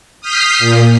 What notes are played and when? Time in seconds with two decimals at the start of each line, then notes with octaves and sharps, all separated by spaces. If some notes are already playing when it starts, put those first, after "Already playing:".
0.21 D#6 F6 G6 B6 C7
0.59 A#2